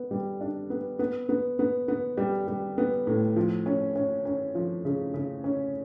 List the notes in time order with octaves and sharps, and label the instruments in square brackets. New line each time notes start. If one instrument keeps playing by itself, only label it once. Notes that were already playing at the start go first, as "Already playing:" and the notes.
Already playing: [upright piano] B3
G3
D4
B3
B3
B3
B3
B3
G3
G3
B3
A2
F3
C#4
C#4
C#4
F3
C#3
C#3
C#4